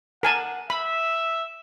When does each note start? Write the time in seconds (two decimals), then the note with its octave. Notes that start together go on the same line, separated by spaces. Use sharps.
0.23 A#4 F#5 G#5 A5
0.70 E5 B5